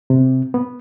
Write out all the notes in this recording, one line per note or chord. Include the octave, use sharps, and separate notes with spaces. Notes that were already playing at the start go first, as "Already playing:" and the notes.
C3
B3